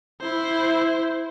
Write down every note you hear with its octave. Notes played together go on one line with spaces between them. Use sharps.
E4 C5